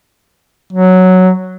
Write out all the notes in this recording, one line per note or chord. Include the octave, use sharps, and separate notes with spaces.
F#3